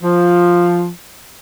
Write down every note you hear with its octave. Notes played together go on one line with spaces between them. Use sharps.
F3